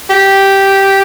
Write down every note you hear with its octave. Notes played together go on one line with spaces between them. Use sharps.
G4